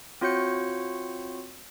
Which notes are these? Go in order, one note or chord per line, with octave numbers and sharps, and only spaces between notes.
C4 F4 F#4 C#5 G6 C#7